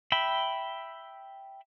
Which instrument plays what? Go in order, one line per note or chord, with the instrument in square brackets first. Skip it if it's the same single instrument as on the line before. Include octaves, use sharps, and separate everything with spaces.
[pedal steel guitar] E5 G5 B5